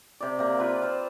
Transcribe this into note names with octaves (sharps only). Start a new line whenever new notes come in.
C3 D5
C3 A#3
C4 F4 B4
C5 F5